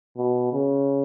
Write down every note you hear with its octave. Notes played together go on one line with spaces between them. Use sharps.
B2
C#3